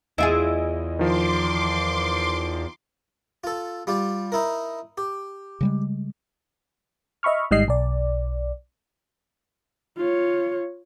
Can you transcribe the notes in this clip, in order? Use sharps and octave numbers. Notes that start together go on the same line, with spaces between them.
E2 E4 F4 G#4 D#5 D7
D#3 F3 C6 D6
F4 A4
G3 F4 G4
D#4 E4 A#4
G4
C#3 G3 G#3
D#5 E5 B5 C#6 F6
G#1 G#2 G3 D#5 C7
B1 D5
F4 C#5